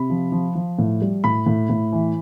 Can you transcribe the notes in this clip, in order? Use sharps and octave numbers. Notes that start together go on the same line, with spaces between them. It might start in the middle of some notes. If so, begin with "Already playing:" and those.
Already playing: C3 B5
F3
F3
F3
A2
G3
A2 B5
A2
A2
E3